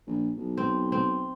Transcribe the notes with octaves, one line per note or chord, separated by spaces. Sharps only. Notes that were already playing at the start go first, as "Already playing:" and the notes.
A#1
B1
C4
C4